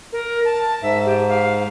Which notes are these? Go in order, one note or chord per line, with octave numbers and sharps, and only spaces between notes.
A#4
A5
G#2 E5
G4
F5